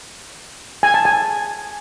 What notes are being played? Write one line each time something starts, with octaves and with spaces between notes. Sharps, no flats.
G#5
A5
G#5